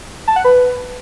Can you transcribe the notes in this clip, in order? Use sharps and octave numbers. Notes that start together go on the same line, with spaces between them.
A5
F#5
B4